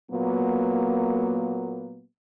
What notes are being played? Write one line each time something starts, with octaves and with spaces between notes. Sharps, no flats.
A#2 F#3 A#3 B3